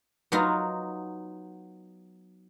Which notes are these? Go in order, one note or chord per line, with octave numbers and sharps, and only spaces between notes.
F#3 B3 D#4 F4